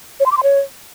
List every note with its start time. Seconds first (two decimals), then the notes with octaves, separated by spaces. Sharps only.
0.20 C#5
0.26 C6
0.32 D6
0.37 C6
0.43 C#5